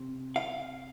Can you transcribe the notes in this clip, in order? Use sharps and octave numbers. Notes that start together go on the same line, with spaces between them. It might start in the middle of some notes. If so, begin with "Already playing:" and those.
Already playing: C3
F5